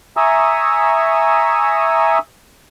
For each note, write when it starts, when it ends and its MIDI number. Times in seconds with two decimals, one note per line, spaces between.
0.17 2.18 76
0.17 2.18 80
0.17 2.18 82
0.17 2.18 85
0.17 2.18 87
0.17 2.18 88